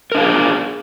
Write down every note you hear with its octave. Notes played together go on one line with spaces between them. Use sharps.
D4 G#4 A#4 F5